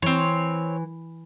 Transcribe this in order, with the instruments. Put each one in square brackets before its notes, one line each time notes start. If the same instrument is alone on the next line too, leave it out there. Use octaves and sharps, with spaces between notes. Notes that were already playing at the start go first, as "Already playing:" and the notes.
[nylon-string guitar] E3 [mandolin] C4 C#5